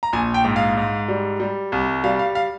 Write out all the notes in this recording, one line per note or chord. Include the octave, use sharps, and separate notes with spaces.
A#5
A#1 G#5
G5
G#2
F5
G#2
G3
G3
C2
G3 F5
F5
F5